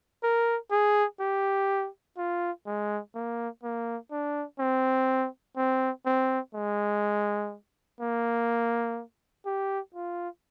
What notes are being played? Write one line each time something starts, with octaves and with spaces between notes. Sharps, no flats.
A#4
G#4
G4
F4
G#3
A#3
A#3
D4
C4
C4
C4
G#3
A#3
G4
F4